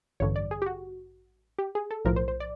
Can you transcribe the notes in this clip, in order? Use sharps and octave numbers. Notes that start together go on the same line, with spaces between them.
A1 G2 D3 C#5
D5
G#4
G4
F#4
G4
G#4
A4
B1 A2 F3 A#4
C5
C5
D5